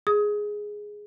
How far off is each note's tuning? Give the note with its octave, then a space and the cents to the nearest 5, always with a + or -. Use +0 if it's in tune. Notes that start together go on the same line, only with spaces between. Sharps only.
G#4 +0 D#6 +25